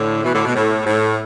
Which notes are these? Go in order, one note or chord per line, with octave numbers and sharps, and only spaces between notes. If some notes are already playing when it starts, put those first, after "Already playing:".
Already playing: A2 D3
B2 E3
A2 D3
B2
A2
A2